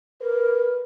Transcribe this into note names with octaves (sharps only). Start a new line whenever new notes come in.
A#4 B4